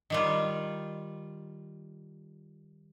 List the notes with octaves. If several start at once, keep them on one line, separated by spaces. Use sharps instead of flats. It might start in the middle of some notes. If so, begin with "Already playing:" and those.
D#3 G3 F4